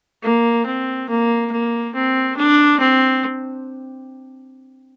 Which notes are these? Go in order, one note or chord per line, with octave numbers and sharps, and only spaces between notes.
A#3
C4
A#3
A#3
C4
D4
C4